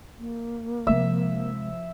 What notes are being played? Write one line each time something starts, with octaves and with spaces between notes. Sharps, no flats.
A#3
C3 F3 G#3 E5